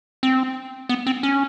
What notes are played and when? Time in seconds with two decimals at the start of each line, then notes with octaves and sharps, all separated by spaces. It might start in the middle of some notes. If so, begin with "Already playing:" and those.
0.23 C4
0.89 B3
1.07 C4
1.23 C#4